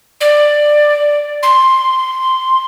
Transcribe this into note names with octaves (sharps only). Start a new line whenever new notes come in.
D5
C6